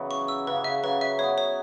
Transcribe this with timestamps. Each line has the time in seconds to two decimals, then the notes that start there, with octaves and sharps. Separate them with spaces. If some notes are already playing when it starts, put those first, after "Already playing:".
Already playing: C#3 E3 F#3 B3
0.11 C#6
0.28 E6
0.47 C#3 B4
0.56 E3
0.64 C#3 E5
0.83 C#3 F#3 B4
1.01 E5
1.19 F#3 B3 C#5
1.38 C#5